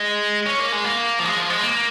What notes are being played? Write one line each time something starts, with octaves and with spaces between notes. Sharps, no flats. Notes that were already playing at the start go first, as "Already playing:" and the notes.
Already playing: G#3
C#4
A#3
G#3
A#3
F3
G#3
F3
G#3
A#3